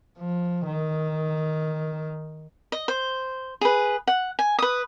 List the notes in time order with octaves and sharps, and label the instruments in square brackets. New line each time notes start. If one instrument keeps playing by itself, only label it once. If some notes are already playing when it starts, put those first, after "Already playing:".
[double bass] F3
D#3
[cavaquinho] D#5
C5
G#4 B4
F#5
G#5
B4 D#6